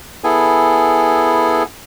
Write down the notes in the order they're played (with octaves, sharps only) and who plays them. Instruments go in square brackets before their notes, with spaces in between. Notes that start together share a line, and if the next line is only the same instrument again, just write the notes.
[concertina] B3 E4 G#4 A4 G#5